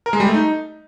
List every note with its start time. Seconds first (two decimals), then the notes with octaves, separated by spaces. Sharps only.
0.06 A#4
0.13 G#3
0.20 G3
0.27 A3
0.34 D#4